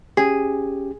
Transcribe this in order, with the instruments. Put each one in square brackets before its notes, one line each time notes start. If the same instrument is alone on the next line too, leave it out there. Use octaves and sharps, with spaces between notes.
[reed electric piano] C#4 G4 [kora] G#4